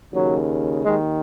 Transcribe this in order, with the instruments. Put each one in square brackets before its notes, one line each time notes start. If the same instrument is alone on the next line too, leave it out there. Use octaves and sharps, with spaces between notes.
[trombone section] D#2 C#3 F#3
D#2 D#3 G#3